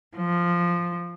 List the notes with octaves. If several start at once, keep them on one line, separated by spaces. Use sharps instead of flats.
F3